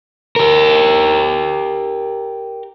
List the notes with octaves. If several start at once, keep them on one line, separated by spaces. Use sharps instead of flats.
G4 A#4